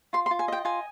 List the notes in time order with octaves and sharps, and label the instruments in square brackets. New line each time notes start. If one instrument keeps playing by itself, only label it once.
[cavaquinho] F4 C6
C6
F4
G#5
D#5 G5
F4 G#5